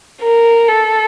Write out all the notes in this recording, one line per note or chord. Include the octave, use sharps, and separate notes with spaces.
A#4
A4